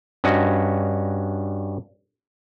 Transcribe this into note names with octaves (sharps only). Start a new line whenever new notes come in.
G2 C#4 F#4 D#5